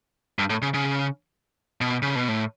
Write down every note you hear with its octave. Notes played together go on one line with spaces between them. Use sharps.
G2
A2
C#3
C#3
B2
C#3
B2
A2